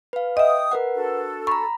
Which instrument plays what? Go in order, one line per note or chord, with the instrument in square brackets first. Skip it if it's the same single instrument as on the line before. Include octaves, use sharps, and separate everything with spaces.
[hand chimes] B4 F5
[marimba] D#5 E5 [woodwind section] G5 D#6
[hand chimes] A#4 B4 F#5
[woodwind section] D4 F#4 A4
[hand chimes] A#5 B5 [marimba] C#6